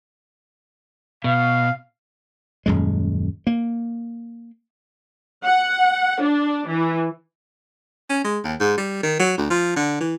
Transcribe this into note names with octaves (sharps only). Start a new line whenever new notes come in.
B2 F5
D#1 F#2 G#3
A#3
F#5
D4
E3
C#4
G#3
D#2
G#2
G3
D#3
F#3
D2
F3
D3
E3